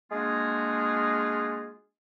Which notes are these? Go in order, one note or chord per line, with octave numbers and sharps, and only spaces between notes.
G#3 A#3 D4 F4 F#4 G#4